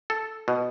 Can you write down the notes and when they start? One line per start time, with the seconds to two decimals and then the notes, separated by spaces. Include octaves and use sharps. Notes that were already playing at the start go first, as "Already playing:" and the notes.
0.10 A4
0.48 B2